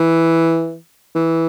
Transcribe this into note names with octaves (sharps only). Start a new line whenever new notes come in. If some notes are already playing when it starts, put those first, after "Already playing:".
Already playing: E3
E3